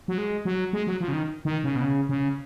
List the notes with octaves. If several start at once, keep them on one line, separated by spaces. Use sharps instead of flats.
F#3
G#3
F#3
G#3
F#3
F3
C#3
D#3
D#3
C#3
B2
C#3
C#3